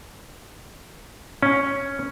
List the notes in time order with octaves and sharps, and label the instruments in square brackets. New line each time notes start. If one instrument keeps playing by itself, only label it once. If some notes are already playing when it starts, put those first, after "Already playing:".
[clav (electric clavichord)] C#4